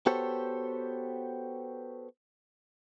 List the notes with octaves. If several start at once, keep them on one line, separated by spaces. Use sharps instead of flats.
B3 F#4 G4 A4 C5 C#5